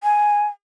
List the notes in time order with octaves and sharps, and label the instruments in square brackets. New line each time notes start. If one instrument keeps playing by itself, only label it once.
[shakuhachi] G#5